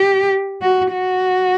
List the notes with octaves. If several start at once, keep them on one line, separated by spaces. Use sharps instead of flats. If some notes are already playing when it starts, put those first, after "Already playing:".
Already playing: G4
F#4
F#4